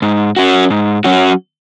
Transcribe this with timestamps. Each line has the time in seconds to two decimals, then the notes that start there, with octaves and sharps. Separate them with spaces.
0.02 G#2
0.37 F#3 C#4 F#4
0.70 G#2
1.04 F#3 C#4 F#4